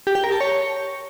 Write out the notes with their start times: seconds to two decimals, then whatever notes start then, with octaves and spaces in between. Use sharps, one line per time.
0.07 G4
0.15 G5
0.24 A#4
0.32 A5
0.41 C#5